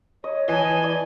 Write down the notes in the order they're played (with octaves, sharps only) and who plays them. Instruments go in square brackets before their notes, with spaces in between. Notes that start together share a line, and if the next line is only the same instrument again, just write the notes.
[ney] C#5 [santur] D#5
[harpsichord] E3 [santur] D#5 A5 [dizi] G#5
[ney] E4 [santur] D5